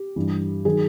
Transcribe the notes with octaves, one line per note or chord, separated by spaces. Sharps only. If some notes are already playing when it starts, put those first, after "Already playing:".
Already playing: G4
G2 E3
D#3 F#3 G#4